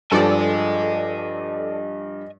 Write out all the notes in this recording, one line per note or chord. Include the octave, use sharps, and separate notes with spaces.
G2 F3 G4 A4 D5 D#5 G#5